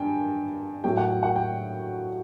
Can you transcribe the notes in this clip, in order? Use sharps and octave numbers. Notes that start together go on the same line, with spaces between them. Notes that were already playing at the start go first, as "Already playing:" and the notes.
Already playing: G2 G5 G#5
A2 F#3 A3 G5
F#5
G5
F#5
G5